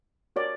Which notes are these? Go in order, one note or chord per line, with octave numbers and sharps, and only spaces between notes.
F#4 A#4 C#5 D5